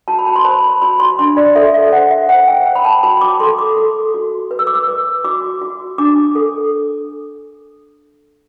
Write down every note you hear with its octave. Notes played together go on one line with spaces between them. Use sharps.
F#4 A5
B5
A5
C6
C5 B5
B5
F#4 B5
C6
D4 C6
D5
A4 E5
E5
C5 F#5
E5
C5 F#5
G5
C5 G5
B5
A5
F#4 B5
D6
A4 C6
D6
A4
F#4
B4
E6
D6
E6
B4
F#4 D6
F#4
D4 D6
A4